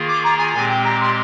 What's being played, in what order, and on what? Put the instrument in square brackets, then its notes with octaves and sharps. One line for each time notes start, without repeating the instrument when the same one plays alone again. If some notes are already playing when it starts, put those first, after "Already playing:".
Already playing: [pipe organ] D#3 A#3 F4 G#4
[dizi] D6
A#5
G#5
[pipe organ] A#2 G#3 C4 G4 [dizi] G#5
[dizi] G5
A#5
C6